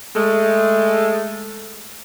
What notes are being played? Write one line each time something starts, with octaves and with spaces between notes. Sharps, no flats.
G#3 A3